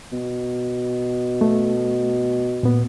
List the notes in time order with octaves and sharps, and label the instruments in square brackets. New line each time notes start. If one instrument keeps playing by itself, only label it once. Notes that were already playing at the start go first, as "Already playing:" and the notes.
[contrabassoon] B2
[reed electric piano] A3
A#2 B3